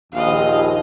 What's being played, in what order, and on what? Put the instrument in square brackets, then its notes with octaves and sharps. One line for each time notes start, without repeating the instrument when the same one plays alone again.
[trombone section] A#1 D#2 [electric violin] D#5 F5